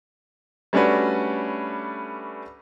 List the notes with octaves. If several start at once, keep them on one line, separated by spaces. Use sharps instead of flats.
G3 A3 C#4 D4 F#4 B4